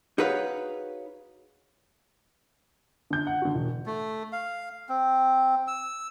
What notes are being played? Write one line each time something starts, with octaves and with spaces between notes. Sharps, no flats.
D#4 F#4 G#4 B4 C#5 F5
D3 G6
F#5
D3 F#4
E1
A3
F5
C4
E6